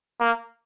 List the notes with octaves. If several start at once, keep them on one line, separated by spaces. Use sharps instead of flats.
A#3